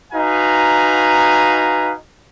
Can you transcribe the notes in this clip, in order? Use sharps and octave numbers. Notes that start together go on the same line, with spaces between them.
D#4 F#4 B4 F5 G#5 A#5